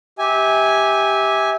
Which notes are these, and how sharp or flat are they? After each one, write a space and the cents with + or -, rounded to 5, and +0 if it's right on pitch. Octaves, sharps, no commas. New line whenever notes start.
G4 +0 E5 -25 G#5 -5